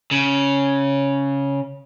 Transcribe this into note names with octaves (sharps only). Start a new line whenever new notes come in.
C#3